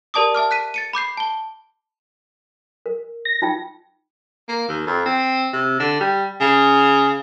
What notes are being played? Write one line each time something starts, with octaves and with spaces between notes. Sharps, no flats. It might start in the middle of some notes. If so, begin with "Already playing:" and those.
G4 A#4 D5 A5 D6 D#6
E5 A5 D6 F6
F#6 B6 D#7
A6 C#7 D#7
B5 D6 G6 C7
A5 G7
A#4
A#6
D#4 F4 G5
A#3
D#2
F2
C4
C3
D3
G3
C#3